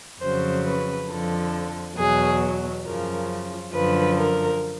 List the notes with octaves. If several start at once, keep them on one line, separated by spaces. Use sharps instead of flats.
F2 C#3 F#3 C5
B4
F2 D3 F3 A4
E2 B2 F#3 G#4
F#2 C#3 F3 A#4
F#2 D3 F3 B4
A#4